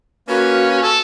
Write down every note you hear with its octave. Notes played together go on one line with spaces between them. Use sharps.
A#3 C#4 F#4 B4
A4